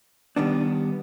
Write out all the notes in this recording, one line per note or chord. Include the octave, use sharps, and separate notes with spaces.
D#3 G3 B3 D4